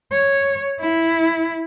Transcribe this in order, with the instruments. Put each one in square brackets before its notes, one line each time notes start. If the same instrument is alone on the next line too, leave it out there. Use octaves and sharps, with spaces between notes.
[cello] C#5
E4